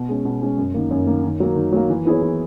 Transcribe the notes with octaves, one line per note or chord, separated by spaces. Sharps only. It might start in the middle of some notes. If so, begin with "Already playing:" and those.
Already playing: B2
G#3 C#4
B2
G#3 C#4
F#2
D#3 A#3
F#2
D#3 A#3
D#3
F#3 A#3
D#3
F#3 A#3
E3
B3 E4 G#4 C#5
E3